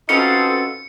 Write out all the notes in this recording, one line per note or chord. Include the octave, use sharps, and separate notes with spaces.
C4 C#4 D#4 F4 F#4 A4 B4 C#7